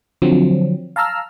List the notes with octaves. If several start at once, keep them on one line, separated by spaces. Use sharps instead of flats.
D3 F3 F#3 C4
F5 A5 A#5 E6 F6